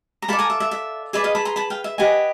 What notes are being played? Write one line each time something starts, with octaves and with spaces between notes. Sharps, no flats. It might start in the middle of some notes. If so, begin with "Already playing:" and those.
A#5
F4 A4 D5 A5 B5
G#5 A#5
E5
E5
E5
G#4 B4 D5 E5
D#5 F5
A5 B5
A#5 C6
A5 B5
F5 G5
E5
G4 B4 D#5 F#5 G#5